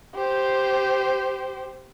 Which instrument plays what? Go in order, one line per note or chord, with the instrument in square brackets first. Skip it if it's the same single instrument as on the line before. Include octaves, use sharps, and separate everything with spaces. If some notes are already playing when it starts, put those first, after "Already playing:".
[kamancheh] G4 C5